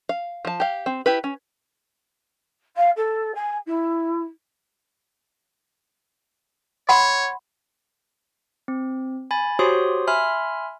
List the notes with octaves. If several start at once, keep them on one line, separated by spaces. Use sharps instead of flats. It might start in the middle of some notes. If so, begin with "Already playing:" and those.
F5
F3 A5
G4 F5
C4
E4 G4 B4
C#4
F5
A4
G#5
E4
C#5 F#5 B5 C6
C4
G#5 B5 A6
F#4 G4 C5 C#5 C6 D#6
E5 G#5 B5 C6 F6